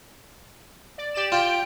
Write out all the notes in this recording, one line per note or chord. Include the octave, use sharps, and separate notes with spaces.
D5
G4 D5 E7
F4 G5